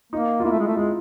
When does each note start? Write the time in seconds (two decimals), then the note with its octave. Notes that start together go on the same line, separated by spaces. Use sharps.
0.13 A#3 D#4
0.40 F4
0.44 A#3 E4
0.52 A3
0.60 G#3
0.67 A3
0.77 G#3 F4